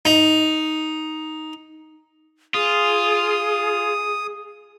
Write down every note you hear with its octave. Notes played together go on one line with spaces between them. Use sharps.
D#4
F4 G#4 D#6